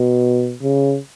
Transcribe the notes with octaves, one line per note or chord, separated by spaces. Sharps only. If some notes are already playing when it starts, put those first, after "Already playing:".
Already playing: B2
C#3